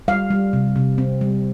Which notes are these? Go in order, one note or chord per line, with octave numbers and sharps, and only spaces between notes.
G3 F5
G3
C3
C3
C4
G3